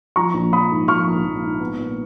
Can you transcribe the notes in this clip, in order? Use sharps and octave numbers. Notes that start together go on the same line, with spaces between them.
F3 A#5 C#6
A#1
A#1 B5 D#6
G#2
F3 C#6 F6
A#1
A#1
G#2
B3
A#2